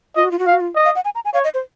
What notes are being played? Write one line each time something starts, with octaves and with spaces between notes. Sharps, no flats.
F4 D#5
F#4
F4
F#4
F4 F5
F#4
F4
D#5
F5
F#5
G#5
A#5
G#5
C#5 F5
D#5
C5